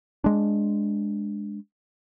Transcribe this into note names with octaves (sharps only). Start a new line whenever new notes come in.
G#3 D4